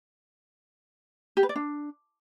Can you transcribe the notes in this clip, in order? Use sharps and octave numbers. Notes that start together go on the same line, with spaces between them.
G4
B4
D5
D4